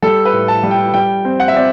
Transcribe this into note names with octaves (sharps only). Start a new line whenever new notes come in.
G3 A4
B4
A2
A5
G3
G5
G3 G5
C4
F#5
E5
C4 D5